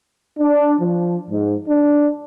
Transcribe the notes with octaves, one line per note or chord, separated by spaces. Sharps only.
D4
F3
G#2
D4